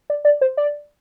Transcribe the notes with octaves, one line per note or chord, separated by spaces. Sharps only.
D5
D5
C5
D5